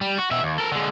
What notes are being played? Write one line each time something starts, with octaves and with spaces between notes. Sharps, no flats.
G3
F#4
B2 E5
D#2
A4 A#4
D3 G#3